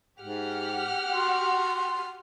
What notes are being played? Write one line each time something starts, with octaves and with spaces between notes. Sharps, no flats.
G#2 G4 F#5 F6
F#4 C6